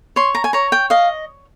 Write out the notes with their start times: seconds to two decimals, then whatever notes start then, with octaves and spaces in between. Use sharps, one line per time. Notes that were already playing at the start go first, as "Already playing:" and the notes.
0.16 C#5 C6
0.35 A#5
0.44 G#5
0.53 C#5 A#5
0.72 G5
0.90 D#5 F5